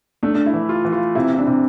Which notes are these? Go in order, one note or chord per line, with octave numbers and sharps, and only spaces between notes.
A3 D4
D4
E4
E3
F4
E3
F4
C3 E4
E4
D4
C3